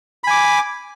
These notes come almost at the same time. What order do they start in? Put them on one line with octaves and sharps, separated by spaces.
B5 G#5 D6